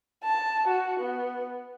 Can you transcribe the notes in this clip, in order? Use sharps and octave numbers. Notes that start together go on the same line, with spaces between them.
A5
F#4
B3